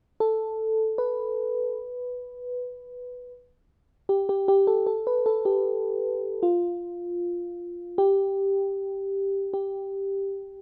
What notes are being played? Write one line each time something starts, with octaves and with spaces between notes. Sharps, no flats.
A4
B4
G4
G4
G4
A4
A4
B4
A4
G4
F4
G4
G4